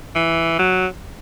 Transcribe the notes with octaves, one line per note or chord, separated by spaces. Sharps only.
E3
F#3